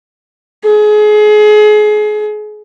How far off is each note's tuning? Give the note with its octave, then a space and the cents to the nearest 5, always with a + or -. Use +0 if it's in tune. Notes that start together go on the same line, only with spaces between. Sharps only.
G#4 +30